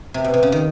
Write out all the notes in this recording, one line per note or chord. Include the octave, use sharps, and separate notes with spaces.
C3
B2
C3
C#3
D#3